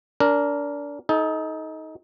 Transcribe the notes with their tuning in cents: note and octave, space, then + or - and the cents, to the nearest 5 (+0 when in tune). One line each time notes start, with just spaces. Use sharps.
D4 -25 A#4 +0
D#4 +20 A4 -25